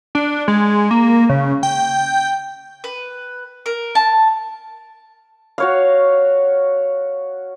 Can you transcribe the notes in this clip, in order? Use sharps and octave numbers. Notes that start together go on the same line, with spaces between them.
D4
G#3
A#3
C#3
G5
B4
A#4
A5
F#4 C#5 F5